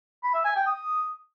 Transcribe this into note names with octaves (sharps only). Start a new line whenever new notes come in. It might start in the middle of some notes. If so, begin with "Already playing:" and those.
B5
E5
G#5
G5
D#6